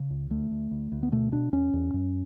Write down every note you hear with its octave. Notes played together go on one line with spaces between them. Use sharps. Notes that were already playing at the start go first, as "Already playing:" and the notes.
Already playing: C#3
C#2
D2 A3
D2
D2
D2
B3
B2 A3
B2 D4
E2 C#4
E2
F#2